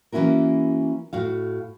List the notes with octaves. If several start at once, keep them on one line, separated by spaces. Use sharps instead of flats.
E3 A#3 C#4 E4 F#4 A#4
A2 F#4 F5